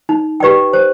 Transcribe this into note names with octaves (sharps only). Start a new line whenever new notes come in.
D#4
G4 B4 D5 G5
C5